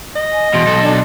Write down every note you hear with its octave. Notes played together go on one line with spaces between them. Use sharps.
D#5
G#5
E2 B2 C6
B1 A4
D4